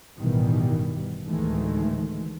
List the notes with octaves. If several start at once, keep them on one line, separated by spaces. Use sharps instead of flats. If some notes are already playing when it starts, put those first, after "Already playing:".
A1 G2 B2 D#3 E3 G3
D2 A2 D#3 E3 G#3 A3